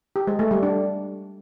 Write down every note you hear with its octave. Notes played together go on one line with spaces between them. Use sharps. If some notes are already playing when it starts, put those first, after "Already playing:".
G4
G#3
A3
G3
D4